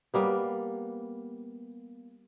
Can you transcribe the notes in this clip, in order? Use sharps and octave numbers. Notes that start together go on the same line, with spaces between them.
G3 A#3 B3